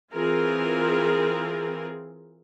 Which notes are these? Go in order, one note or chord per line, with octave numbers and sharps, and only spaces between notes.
E3 C4 F4 G#4 A#4